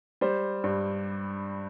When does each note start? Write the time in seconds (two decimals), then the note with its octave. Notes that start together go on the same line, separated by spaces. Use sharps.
0.21 G3 C5
0.64 G2